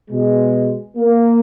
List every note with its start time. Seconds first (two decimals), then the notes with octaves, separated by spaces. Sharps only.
0.10 B2 G#3
0.97 A#3